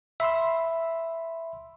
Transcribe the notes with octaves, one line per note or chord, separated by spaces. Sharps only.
E5 B5 C6 E6